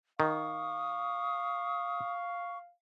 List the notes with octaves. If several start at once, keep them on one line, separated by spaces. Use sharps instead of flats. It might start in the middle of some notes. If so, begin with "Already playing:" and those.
D#3 F5 C#6 D#6